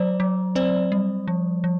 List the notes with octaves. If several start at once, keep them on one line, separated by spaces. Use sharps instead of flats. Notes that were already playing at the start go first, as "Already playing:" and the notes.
Already playing: F#3 C5 D5
F#3
C4 C5 D5
G3
F3
F3